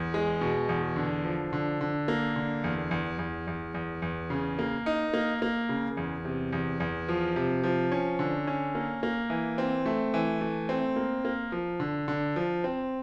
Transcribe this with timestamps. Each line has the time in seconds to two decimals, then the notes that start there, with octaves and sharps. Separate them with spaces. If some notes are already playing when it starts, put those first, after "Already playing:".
Already playing: E2
0.14 G#3
0.41 B2
0.69 E2
0.96 D3
1.24 F3
1.53 D3
1.81 D3
2.08 A#3
2.36 D3
2.64 E2
2.91 E2
3.18 E2
3.47 E2
3.74 E2
4.02 E2
4.30 C#3
4.59 A#3
4.86 D#4
5.13 A#3
5.42 A#3
5.69 C#3
5.97 E2
6.25 C3
6.52 E2
6.80 E2
7.09 F3
7.36 C3
7.64 F3
7.92 C#4
8.19 D3
8.47 C#4
8.75 A#3
9.03 A#3
9.30 E3
9.58 C4
9.86 A3
10.14 E3
10.41 A3
10.69 C4
10.96 A#3
11.25 A#3
11.52 F3
11.80 D3
12.08 D3
12.36 F3
12.64 C4